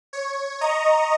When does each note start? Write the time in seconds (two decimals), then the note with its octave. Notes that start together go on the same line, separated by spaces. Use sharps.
0.13 C#5
0.61 D#5 A#5 C#6